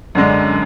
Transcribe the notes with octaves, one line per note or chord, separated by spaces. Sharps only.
F#2 D3 G#3 D4